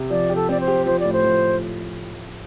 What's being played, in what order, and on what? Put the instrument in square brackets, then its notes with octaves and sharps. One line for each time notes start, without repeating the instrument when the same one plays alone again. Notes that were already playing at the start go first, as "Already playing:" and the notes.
Already playing: [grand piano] C3
[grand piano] F3 [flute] D5
[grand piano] G4
[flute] A4
[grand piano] C4 [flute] D5
[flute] C5
[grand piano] G4
[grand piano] F3 [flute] C5
[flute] D5
[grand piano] A2
[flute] C5
[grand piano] F3